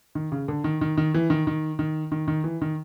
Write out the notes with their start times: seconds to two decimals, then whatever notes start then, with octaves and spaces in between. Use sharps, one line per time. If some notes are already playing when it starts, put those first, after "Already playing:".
0.15 D#3
0.32 C#3
0.48 D3
0.64 D#3
0.81 D#3
0.97 D#3
1.14 E3
1.30 D#3
1.47 D#3
1.79 D#3
2.12 D#3
2.28 D#3
2.44 E3
2.62 D#3